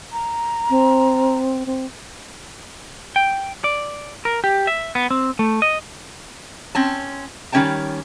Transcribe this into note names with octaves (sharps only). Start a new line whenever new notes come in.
A#5
C4
C4
G5
D5
A#4
G4
E5
B3
C4
A3
D#5
C4 C#4 A5
D#3 G3 C#4 C#5 G5 A5